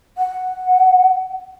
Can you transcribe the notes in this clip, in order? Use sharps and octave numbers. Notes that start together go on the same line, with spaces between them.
F#5